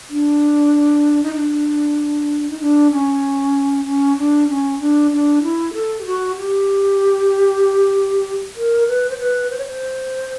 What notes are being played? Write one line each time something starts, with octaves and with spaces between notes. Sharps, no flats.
D4
D#4
D4
D#4
D4
C#4
C#4
D4
C#4
D4
D4
E4
A4
G4
F#4
G4
A#4
B4
C5
B4
C5
C#5
C5